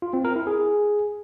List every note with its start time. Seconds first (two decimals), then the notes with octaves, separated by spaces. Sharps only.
0.02 F4
0.13 C4
0.25 A#4
0.36 E4
0.47 G#4